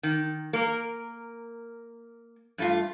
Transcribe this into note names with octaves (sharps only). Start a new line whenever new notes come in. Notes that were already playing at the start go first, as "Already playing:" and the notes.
D#3
A#3 A#4
G2 A3 F4